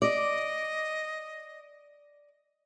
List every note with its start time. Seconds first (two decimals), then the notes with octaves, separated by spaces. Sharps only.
0.02 D5 D#5